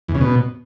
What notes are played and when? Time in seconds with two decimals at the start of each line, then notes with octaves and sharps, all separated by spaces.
0.08 E2
0.15 C#3
0.21 B2